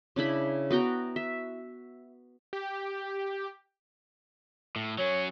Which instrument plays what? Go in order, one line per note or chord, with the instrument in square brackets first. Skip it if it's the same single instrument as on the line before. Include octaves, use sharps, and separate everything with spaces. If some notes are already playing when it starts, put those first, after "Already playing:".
[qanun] C#3 D4 E4 B5
B3 F#4 G5 A#5
E5
[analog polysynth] G4
[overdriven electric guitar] A2
[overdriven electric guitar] F#3 C#4 [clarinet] C#5